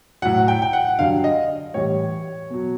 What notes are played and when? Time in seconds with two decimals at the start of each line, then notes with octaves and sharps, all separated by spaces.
0.22 A2 F#3 F#5
0.48 G5
0.62 G5
0.73 F#5
0.99 G2 D3 F#3 F5
1.24 D#5
1.74 A2 E3 G3 C#5
2.50 B2 F#3